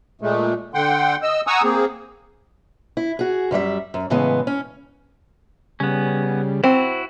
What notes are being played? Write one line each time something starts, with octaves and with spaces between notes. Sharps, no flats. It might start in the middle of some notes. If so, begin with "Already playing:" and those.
A#2 G#3 A3
D3 F#5 G5 C6
D#5 E6
F#5 G#5 A#5 C#6 D#6 E6
A#3 C4 G#4
E4
F#4 G#4
F#2 G3 F#4 E5
F#2
A2 C#3 E3 G#3 B3
C#4
C#3 G3 B3 C#4
C4 E4 F#4